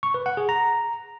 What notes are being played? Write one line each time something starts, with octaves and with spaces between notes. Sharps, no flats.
C#6
B4
F#5
G#4
A#5